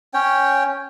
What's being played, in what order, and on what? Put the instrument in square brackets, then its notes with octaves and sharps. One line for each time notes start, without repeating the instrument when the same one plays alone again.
[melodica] C#4 C#5 G5